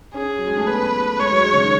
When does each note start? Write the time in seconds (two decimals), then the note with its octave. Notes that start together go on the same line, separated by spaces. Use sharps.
0.14 C#4 G#4
0.38 F#3
0.47 G#3
0.57 A3
0.67 B3 B4
0.92 A3
1.19 G#3 C#5
1.31 F#3
1.44 G#3
1.53 C#3
1.62 D#3